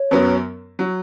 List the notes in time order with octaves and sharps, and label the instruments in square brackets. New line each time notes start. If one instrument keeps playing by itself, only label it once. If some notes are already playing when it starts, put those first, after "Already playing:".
Already playing: [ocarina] C#5
[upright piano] F#2 F#3 B3
F#3